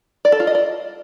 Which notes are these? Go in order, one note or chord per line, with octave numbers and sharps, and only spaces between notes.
D5
A4
F4
D#5
D5